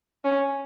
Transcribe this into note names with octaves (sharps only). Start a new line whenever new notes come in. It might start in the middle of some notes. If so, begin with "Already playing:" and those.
C#4